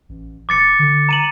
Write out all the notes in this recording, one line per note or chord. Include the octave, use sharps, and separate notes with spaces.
A1
D#1 D6 A6 C#7
D3
A#5 D#7 F#7